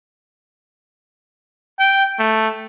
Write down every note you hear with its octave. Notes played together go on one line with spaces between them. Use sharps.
G5
A3